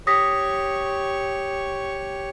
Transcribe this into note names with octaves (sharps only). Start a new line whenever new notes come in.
G4 C#5 C#6 D#6 A#6 B6